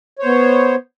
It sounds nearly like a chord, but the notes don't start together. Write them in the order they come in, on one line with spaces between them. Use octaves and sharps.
C#5 C5 B3